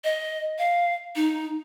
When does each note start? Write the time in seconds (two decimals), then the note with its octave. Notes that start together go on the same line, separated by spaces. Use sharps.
0.04 D#5
0.58 F5
1.16 D#4